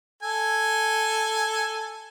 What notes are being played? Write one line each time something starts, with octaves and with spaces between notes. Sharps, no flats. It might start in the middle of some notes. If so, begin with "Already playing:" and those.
A4 G#5